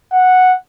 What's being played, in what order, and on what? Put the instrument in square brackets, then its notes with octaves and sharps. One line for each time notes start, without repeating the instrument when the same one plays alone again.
[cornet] F#5